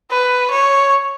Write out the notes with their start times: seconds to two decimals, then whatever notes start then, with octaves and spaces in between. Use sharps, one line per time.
0.11 B4
0.51 C#5